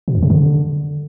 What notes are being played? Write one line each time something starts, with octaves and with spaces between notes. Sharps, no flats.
B2
F2
C3
D3